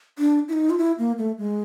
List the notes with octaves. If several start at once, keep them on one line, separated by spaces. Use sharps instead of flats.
D4
E4
D#4
F4
E4
A#3
A3
G#3